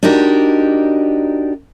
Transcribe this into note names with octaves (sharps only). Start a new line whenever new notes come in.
D4 D#4 F#4 G4 A#4